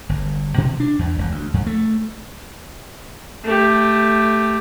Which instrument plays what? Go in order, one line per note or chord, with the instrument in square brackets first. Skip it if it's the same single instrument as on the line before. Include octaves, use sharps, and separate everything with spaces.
[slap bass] G1
B2
D4
E2
E1
D2
F2
A3
[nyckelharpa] A3 G4